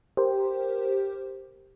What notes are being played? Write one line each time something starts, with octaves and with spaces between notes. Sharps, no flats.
G4 A#4 C5